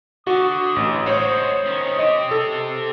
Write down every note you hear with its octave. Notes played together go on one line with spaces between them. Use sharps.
D3 F#4 D#6
A1
G#3 F#4 C5 C#5
D#3 C#4
C4 G4 D#5
A4